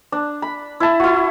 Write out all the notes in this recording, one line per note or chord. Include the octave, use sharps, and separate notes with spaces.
D4
B5
E4 A5
E4 F#4